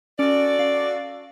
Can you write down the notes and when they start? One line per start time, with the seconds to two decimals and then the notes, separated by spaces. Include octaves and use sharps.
0.19 C#4 F#4 A4 D5
0.59 F5